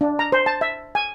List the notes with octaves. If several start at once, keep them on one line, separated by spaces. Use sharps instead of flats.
D4
A#5
C5
A5
E5
G#5